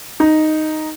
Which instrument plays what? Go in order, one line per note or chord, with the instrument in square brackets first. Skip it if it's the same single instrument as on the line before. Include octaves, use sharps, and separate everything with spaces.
[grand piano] D#4